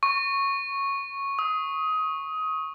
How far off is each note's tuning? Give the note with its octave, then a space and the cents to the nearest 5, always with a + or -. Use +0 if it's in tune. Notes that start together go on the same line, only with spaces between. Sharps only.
C#6 -5
D#6 +25